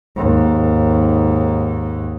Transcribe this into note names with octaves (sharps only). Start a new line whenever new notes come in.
D#2 G#2